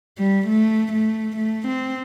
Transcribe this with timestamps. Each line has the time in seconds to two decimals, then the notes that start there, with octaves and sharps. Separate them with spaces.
0.18 G3
0.48 A3
0.93 A3
1.37 A3
1.68 C4